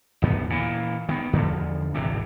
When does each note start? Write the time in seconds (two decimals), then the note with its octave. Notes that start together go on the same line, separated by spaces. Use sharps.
0.22 G1 D#2 B3
0.50 A#2 E3
1.09 D#3 B3
1.33 E2 D3 F3
1.94 D1 G#1 C3 E3